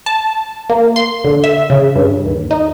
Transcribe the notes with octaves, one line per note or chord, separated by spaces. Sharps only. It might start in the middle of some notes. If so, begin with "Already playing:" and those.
A5
A#3
C6
D3
E5
C#3
G2
D#2
D#4